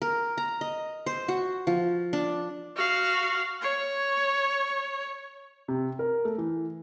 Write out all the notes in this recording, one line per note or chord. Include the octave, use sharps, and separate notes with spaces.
A#4
A#5
D#5
C5
F#4
F3
D4
F#4 F5
C#5
C3
A#4
A3
E3